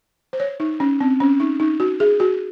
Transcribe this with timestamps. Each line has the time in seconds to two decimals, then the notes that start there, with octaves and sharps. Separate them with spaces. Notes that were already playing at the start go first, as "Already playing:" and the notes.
0.33 C5
0.40 C#5
0.60 D#4
0.80 C#4
1.01 C4
1.20 C#4
1.40 D#4
1.60 D#4
1.80 F#4
2.00 G#4
2.20 F#4